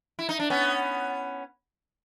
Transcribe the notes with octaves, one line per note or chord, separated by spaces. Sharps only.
E4
D#4
D4
B3 C#4